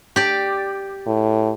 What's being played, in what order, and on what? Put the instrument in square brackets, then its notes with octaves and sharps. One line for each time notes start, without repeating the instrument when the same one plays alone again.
[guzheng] G4 D5
[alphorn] A2